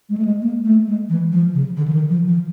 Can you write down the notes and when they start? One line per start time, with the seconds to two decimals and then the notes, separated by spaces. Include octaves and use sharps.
0.09 G#3
0.18 A3
0.25 G#3
0.42 A#3
0.65 A3
0.87 G#3
1.09 E3
1.32 F3
1.54 C#3
1.76 D3
1.88 E3
1.93 D#3
2.10 F3
2.27 F3